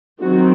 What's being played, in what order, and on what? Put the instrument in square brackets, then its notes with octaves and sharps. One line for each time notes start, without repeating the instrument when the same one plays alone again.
[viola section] D#3 F#3 C4 F#4